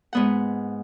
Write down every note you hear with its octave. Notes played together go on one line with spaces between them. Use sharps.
G#2 B3 F#5